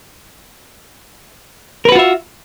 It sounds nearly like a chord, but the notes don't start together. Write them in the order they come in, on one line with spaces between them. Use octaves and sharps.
A#4 B4 F#4 F4 E5